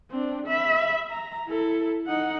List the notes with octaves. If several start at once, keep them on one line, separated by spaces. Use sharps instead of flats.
C4 D4
E5 B5
A#5
E4 A4
D#4 F#5